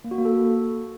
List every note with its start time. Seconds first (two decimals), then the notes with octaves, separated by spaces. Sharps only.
0.04 A#3
0.11 F#4
0.18 A#3
0.25 A4